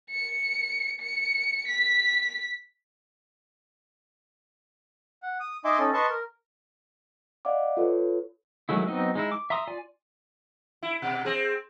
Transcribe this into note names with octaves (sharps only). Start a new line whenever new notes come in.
C#7
C#7
B6
F#5
D#6
D#4 D#5 E5 G#5 C6 D6
C#4 D#4 A4
B4 D#5 A5 C6 C#6
A#4
D5 D#5 F5 F#5 D6
F4 A4 B4 C#5
D#3 F#3 G#3 A3 E4
F#3 B3 C4 D#4 D#5
G#3 D#4 E4
D6
E5 A#5 C6 D#6
F4 D5 G#5
E4
B2
C4 G#4